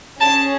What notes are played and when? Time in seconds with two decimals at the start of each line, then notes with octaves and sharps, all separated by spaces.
0.21 C#4 G#4 A5